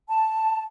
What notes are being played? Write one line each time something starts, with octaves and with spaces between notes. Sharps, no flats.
A5